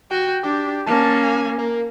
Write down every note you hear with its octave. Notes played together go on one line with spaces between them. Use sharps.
F#4 G5
D4 G4
A#3 C#4 A5
G#5
A#3